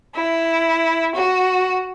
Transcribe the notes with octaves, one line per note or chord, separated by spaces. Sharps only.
E4
F#4